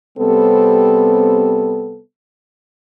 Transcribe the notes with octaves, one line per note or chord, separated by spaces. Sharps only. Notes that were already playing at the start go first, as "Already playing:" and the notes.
C3 G3 B3 C4 A4